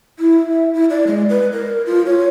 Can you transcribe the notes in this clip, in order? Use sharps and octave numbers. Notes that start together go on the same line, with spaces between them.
E4
E5
E4
D5
G#3
B4
A#4
F4
C#5